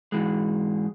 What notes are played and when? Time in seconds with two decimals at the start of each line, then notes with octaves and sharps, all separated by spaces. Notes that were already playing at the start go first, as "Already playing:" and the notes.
0.12 G#2 E3 G#3